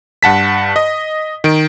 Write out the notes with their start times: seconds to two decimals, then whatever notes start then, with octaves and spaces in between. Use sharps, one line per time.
0.23 G2 F#5 A5 B6
0.76 D#5
1.44 D#3 D7